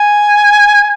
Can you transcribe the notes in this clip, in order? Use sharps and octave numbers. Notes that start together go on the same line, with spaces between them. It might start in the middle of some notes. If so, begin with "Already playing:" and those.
Already playing: G#5